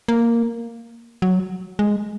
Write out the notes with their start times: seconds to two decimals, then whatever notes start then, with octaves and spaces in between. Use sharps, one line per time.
0.08 A#3
1.22 F#3
1.79 G#3